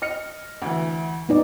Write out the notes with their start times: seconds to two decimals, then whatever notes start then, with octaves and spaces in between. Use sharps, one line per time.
0.02 D#5 F6 C#7
0.62 D2 E3
1.29 B3 D#4 D5